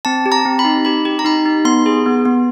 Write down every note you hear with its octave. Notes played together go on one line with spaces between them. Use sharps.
C4 A5
G4
A#5
C4
B5
D#4
G4 B5
G4
A#5
D#4 B5
D#4
B3 C6
G#4
B3
B3